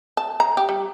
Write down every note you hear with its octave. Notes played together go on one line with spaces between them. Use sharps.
A5
A#5
G4
G3